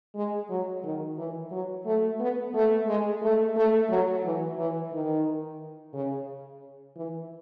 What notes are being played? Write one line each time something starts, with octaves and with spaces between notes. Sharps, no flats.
G#3
F#3
D#3
E3
F#3
A3
B3
A3
G#3
A3
A3
F#3
E3
E3
D#3
C#3
E3